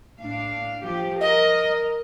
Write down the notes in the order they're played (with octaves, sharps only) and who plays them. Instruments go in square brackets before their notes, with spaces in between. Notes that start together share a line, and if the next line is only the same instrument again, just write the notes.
[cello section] A2 D4 F5
F3 G4
[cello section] A#4 [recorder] D#5